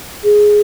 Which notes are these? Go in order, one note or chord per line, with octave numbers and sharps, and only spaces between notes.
G#4